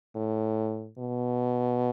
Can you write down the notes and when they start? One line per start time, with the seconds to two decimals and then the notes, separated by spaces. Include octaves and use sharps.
0.16 A2
0.99 B2